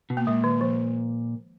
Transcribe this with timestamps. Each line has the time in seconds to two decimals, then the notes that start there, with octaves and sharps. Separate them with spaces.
0.10 B2
0.17 A#3
0.27 A#2 G#3
0.44 D#3
0.61 F3